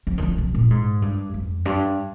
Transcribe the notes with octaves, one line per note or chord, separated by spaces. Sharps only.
F3
D#3
F3
C3
A#2
G#2
G2
F2
G2